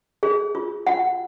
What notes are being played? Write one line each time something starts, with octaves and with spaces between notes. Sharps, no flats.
G#4
F4
F4 F#5